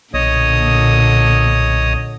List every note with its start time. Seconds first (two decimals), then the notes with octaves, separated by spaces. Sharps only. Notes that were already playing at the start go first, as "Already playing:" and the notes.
0.14 B1 A#2 D3 C#5 D#5 D#6